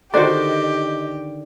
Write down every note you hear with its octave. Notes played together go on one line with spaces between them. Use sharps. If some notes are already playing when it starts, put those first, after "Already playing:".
D3 D#3 D4 F#4 G4 C5 D5 D#5